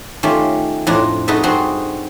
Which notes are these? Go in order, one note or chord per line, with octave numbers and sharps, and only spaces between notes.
D#3 A3 C#4 F4 G4
F2 A2 D4 A#5
D#4 F#4 G#4 A4 B4 E5
G2 C4 F#4 G#4 A4 C6